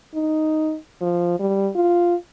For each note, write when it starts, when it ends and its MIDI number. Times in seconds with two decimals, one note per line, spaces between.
0.15 0.77 63
1.01 1.37 53
1.40 1.70 55
1.75 2.15 65